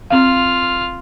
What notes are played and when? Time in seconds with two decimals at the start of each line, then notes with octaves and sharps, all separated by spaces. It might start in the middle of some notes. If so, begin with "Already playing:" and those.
0.10 C4 F4 F5 F6